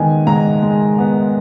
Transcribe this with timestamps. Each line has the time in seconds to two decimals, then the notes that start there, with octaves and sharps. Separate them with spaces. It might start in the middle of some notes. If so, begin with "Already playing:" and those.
Already playing: G#2 D#3 B3 G#5
0.27 G#2 A#5
0.62 G#3
0.98 B3